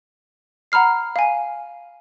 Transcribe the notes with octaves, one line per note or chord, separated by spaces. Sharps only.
F#5 A#5 B5 F6 C7
F5 G#5